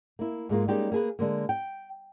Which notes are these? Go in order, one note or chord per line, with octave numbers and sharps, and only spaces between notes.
A#3 E4
G#2 G#3 A#3 F4
G3 G#3 A#3 C#4 D#4 G4
A#3 G#4 B4
D3 G#3 A#3
G5